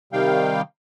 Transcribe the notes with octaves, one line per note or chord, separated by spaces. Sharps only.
C3 D#3 G3 F5 G5